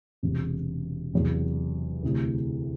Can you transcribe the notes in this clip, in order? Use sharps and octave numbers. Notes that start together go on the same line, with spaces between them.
E1 E2 C3
E2 C3 F#3
D2 C3 E3